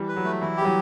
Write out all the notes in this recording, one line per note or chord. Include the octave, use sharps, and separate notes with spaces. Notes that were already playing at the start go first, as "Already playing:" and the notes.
Already playing: E3 G3
B4
F#3
A3
E3 E4
G3 G4
F#3